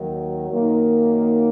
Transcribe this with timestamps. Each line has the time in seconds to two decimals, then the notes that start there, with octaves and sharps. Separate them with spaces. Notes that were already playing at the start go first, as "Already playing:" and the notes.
Already playing: D#2 D#3 F#3
0.49 F#2 D#3 A#3 D#4